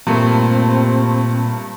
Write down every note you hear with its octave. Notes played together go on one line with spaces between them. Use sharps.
G2 A#2 A3 A#3 C4